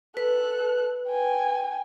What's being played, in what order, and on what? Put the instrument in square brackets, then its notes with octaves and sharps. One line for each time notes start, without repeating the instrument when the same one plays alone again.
[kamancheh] A4 F#6 [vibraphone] B4
[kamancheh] G5 G#5